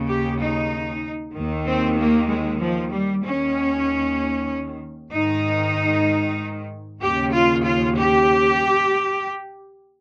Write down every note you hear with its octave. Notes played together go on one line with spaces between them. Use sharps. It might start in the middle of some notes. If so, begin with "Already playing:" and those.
Already playing: D#2 C#3
G4
D#4
D#2 D#3
C4
A#3
G#3
F3
G3
D#2 D#3 C#4
G#2 D#3 D#4
D#2 C#3 G4
F4
F4
G4